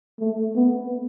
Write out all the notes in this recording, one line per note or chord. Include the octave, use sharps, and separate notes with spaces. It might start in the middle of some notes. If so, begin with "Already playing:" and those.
A3
B3